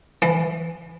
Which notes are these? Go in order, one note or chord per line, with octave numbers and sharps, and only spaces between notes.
E3